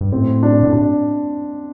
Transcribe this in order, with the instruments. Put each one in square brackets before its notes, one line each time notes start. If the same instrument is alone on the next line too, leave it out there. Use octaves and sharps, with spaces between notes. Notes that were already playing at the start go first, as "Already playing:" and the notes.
[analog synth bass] G2
[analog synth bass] A2 [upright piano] C4
[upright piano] D4
[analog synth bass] A2
[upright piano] D4